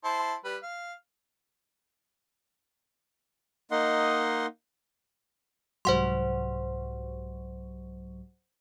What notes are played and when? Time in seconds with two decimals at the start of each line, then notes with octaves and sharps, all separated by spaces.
0.04 E4 C5 A5
0.44 G3 B4
0.63 F5
3.71 A#3 D#4 D#5 F#5 C6
5.85 C2 G#2 F#3 C5 F#5 C6